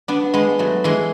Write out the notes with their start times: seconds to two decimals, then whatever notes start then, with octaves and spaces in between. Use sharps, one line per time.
0.08 B3 D4
0.34 G#3 B3
0.59 F#3 A3
0.84 E3 G#3